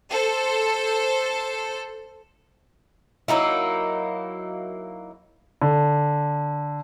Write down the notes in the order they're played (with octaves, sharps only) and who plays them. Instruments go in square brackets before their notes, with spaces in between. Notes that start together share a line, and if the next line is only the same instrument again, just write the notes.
[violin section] A4 C5
[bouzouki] F#3 A#3 D#4 E4
[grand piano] D3